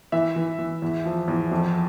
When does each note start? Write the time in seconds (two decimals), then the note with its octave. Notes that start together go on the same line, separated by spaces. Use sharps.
0.12 E3 E5
0.36 E3
0.59 E3
0.82 E2
1.05 F3
1.28 E2
1.51 F2